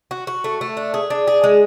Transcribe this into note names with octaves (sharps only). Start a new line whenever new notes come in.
F#4
F#4
A3
A3
D4
G#4
D4
G#4
G#3